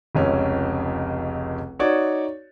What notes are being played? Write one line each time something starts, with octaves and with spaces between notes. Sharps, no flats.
F1 C#2 C#4
D#4 F#4 C#5 D5